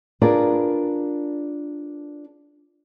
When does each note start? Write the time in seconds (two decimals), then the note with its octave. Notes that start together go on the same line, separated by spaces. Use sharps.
0.21 D4 F4 G#4 A#4 B4 D5